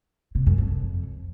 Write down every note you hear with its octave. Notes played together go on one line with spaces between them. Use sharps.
C3
F#2
F2